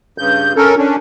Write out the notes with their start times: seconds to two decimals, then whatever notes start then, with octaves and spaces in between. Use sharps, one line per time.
0.18 G2 C#3 G6
0.56 C#4 A4 A#4
0.78 C#4 D4